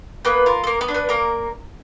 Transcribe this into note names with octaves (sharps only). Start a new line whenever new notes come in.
A#3 B3 B4
F4 A#4
A4
A#3 A#4
B3 B4
D4
B3 B4
A#3 A#4